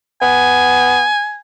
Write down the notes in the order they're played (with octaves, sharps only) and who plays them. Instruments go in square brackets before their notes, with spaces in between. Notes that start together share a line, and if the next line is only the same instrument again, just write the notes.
[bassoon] B3 [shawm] G#5